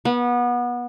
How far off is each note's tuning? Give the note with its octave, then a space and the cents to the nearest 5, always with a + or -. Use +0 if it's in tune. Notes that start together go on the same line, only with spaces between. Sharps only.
B3 -25